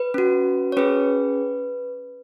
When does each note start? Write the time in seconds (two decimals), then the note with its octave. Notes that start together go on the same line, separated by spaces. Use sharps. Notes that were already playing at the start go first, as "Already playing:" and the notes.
Already playing: B4
0.14 C#4 F#4
0.72 C#5
0.77 C#4 G#4 B4